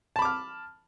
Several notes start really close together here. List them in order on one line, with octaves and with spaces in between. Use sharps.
A5 B5 D6 F6